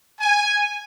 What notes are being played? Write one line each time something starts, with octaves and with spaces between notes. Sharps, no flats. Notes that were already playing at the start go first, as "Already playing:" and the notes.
G#5